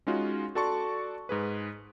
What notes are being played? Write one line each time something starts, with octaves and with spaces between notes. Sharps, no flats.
G#3 C#4 D#4 F4 F#4
F#4 A4 D5 A5 C6 C#6
G#2 G#4 B4